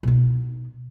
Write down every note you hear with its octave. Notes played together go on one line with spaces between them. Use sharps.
B2 D#4